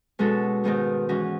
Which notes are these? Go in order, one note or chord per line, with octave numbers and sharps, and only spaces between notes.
B2 G#3 C#4 F#4 A4
G#2 D#3 G#3 B3 D#4
E3 G#3 C#4 F#4